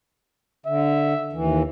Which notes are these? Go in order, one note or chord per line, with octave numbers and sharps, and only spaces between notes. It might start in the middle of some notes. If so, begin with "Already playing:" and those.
D3 E5
D#2 E3